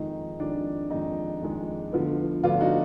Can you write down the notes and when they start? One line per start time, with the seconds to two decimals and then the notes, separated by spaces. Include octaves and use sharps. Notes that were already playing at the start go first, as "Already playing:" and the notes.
Already playing: F2 D#3 G#3 D#4
0.39 F2 D#3 G#3 D4
0.90 F2 D#3 G#3 D#4
1.42 F2 D#3 G#3
1.93 D2 D3 F3 B3
2.43 D2 D3 F3 B3 D4 F4
2.61 D#4 F#4